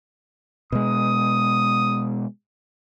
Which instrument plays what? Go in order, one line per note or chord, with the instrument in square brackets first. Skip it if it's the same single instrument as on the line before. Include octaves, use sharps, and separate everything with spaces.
[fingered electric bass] B2 G#3 [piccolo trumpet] D#6